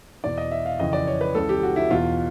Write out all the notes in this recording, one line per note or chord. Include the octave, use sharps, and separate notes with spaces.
E2 B2 D5
D#5
E5
F5
F2 C#3 E3 D#5
D5
C#5
B4
C#2 C#3 E3 A4
G4
F#4
E4
E2 B2 F4